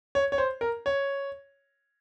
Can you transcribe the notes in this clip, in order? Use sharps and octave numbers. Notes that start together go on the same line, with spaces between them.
C#5
C#5
C5
A#4
C#5